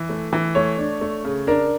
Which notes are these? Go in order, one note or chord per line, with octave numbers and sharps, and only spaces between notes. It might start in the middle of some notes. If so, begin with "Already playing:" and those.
Already playing: E3
A3
E3
A3 C#5
D4
A3
C#3
D4 A#4